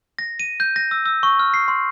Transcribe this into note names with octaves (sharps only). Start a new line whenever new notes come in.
A#6
D#7
G6
A#6
E6
E6
C#6
F6
C7
C6